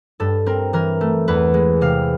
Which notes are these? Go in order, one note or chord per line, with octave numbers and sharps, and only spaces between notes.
G2 A4
C4 A#4
E3 A#4
A3
E2 B4
G#3
C3 F5